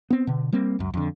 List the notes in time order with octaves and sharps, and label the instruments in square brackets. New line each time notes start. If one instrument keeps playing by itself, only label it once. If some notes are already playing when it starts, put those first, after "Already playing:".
[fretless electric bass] B3 C4
B2 D3
G3 A#3 C4
C#2 F#2
F2 D3